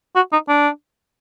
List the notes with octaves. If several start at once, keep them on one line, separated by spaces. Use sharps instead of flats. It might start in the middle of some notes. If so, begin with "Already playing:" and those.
F#4
D#4
D4